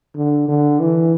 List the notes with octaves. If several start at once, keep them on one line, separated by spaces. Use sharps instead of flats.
D3
D3
E3